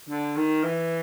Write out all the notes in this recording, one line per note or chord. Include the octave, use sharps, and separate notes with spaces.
D3
D#3
E3